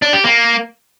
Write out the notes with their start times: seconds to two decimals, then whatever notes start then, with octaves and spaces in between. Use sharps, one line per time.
0.02 D4
0.13 G4
0.24 A#3